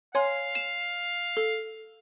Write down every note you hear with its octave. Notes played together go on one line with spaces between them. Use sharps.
C#5 F5 G#5 C6
E7
A4